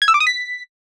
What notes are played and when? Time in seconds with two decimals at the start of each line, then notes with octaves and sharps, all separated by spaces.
0.02 G#6
0.08 E6
0.14 D6
0.20 D#6
0.27 B6